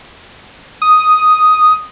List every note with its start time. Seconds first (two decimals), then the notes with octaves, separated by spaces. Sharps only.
0.82 D#6